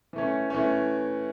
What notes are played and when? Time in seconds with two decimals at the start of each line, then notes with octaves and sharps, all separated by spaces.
0.13 E3 A3 C#4
0.50 E3 A3 C#4